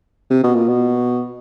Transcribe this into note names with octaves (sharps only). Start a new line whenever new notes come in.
C3
B2
A#2
B2